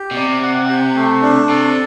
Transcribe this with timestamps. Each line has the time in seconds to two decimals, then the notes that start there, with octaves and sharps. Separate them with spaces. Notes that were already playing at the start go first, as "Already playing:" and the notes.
Already playing: G4
0.11 B2
0.16 C3 D5
0.42 F#5
0.70 G4
0.95 A3
1.22 D4
1.49 C3 A4